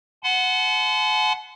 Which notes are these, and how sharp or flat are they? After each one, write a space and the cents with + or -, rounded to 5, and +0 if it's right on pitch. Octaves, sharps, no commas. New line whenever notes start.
F#5 +0 A5 -45 C6 -40